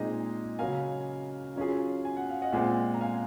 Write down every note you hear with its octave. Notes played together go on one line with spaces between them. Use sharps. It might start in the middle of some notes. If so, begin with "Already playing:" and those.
Already playing: A#2 G#3 C4 D#4 G#4 D#5
C#3 F#3 C#4 F#4 A#4 F5 G#5
F#3 C#4 F4 G#4
G#5
F#5
F5
D#5 F#5
A#2 G#3 C4 F4
A#5
F5 G#5